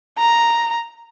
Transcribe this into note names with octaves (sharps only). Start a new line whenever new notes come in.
A#5